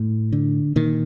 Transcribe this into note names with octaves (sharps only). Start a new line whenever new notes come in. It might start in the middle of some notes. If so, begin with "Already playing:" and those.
Already playing: A2
D3
A#2 D#3